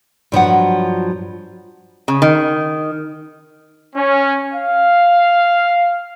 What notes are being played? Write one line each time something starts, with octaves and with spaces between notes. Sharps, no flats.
G2 F3 F#3 F#5
C#3
D#3
C#4
F5